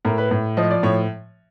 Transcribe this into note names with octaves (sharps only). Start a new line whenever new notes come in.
A2 A#4
B4
A2
F3 D#5
D5
A2 C#5